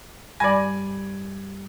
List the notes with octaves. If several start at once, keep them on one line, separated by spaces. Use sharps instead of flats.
G2 G3 D5 G#5 B5